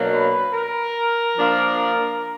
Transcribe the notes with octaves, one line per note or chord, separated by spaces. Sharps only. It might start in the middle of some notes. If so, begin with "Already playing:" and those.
Already playing: B2 F#3 A#3 D4
B4
A#4
F3 A#3 D4 F4